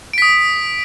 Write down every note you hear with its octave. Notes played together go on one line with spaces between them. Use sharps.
D#6 B6 D7